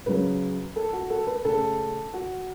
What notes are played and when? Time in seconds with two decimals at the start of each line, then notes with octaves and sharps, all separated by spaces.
0.06 C#3 F#3 C#4 B4
0.76 A4
0.93 F#4
1.10 A4
1.27 B4
1.45 C#3 A3 C#4 A4
2.14 F#4